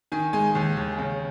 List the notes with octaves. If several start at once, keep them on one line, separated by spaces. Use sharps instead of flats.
D#3 G#5
G#3 G#5
D#2
D#2
C#3